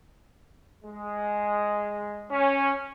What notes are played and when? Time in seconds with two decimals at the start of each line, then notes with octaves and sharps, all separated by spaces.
0.85 G#3
2.30 C#4